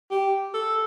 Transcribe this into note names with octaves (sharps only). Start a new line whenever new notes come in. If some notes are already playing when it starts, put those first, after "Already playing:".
G4
A4